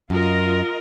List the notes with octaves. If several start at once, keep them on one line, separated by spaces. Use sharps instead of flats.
F#2 F4 A#4 D#5